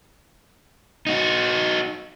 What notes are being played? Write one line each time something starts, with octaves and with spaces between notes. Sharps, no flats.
D#4 F#4